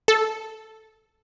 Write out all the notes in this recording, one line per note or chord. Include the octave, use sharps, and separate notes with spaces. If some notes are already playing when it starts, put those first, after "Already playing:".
A4